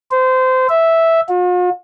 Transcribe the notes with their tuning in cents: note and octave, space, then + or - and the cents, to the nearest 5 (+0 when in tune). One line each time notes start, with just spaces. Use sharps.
C5 -25
E5 -5
F4 +45